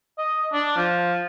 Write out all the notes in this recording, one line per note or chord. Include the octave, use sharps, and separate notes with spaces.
D#5
D4
F3